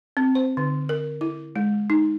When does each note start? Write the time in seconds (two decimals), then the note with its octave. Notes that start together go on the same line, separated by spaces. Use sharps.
0.17 C4
0.35 C5
0.57 D3
0.89 A#4
1.21 E4
1.56 G#3
1.90 D#4